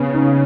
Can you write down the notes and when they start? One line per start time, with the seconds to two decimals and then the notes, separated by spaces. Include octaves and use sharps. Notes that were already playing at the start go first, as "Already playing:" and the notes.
Already playing: C#3 B3 C#4
0.14 C#4 D#4